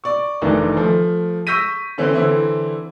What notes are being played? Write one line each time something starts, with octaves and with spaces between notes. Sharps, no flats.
D5 C#6
F1 D#3 E3 D4 D#4
F3 A3
C#6 E6 G6 A#6 B6 D#7
D3 E3 C4 C#4
D3 E3 C4 E4